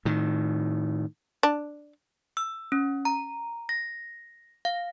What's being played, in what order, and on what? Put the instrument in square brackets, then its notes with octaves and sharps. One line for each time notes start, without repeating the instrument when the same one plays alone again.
[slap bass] A2 D#3
[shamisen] D4
[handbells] E6
C#4
A#5
A#6
F5